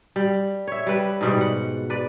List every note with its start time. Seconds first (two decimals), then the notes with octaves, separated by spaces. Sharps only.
0.16 G3
0.67 C#5 E5
0.87 G3 B4
1.21 G#2 B2 G3
1.41 F#5
1.90 B4 D5